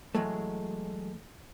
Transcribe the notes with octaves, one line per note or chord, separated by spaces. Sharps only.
E3 F#3 G#3 A3